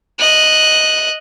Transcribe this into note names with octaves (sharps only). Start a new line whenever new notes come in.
D#5 F#6